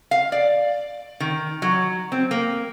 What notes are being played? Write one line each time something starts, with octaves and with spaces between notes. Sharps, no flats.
F5
D5
D#3
F#3
C4
A#3